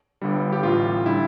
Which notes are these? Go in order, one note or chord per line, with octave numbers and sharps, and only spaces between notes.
G1 G2 D3 G3
G4
A1 A2 G3 F4
D3 G3 E4